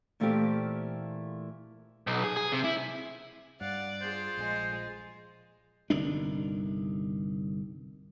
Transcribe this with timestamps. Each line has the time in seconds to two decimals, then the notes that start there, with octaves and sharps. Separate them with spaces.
0.20 A#2 E3 A3 C4 F4 G4
2.07 B1
2.24 G#4
2.37 G#4
2.52 C3
2.64 E4
3.61 G2 D5 F5 F#5
4.01 F4 G#4 C5
4.37 A#1 G#3
5.90 G1 C2 D#3 D4